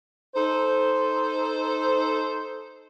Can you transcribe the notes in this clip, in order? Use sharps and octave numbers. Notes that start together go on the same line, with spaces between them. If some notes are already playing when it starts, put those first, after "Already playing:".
D#4 A4 C5